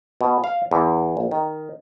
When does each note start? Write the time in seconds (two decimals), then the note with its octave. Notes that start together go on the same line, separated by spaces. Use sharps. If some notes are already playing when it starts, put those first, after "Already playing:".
0.21 B2
0.44 F5
0.71 E2
1.17 A#1
1.31 D#3